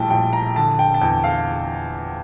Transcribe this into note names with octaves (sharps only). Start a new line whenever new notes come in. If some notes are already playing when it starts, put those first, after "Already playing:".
Already playing: A#1 A2 G3 G5 A5
A#1 G5
A#5
D3 A5
G5
A5
E2 G5
F5